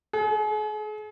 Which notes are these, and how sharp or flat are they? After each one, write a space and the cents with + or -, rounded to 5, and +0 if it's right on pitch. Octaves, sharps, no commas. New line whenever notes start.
G#4 +40